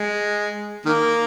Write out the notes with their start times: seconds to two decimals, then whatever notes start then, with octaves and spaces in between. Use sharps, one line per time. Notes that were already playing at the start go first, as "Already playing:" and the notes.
Already playing: G#3
0.86 D#3 A#3